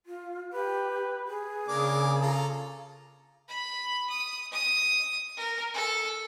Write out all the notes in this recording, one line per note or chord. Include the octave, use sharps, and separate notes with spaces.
F4
G4 B4
G#4
C#3 A#3 D4 D6
F4 A4 A#5
B5
D#6
D#6
A#4
A4